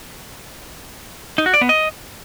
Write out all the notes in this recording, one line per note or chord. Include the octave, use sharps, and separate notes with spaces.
D#4
F#4
D5
B3
D#5